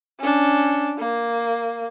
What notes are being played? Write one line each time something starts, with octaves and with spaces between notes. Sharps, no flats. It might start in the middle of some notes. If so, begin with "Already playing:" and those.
C#4 D4
A#3